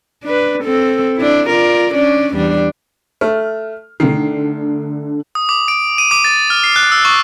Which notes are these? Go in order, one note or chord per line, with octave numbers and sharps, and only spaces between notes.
D4 B4
C4 A4
D4 E4
F4 A#4 D5
C#4 D4 D5
E2 G3 D4
A3 F6
D3 D#3 A3 C7
D#6
D6
D7
D#7
D6
A6
F6
C7
F#6
E6
C#6